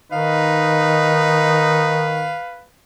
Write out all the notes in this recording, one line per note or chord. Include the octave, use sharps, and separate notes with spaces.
D#3 D#4 B4 F5